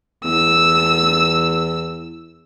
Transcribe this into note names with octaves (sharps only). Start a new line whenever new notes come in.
E2 E6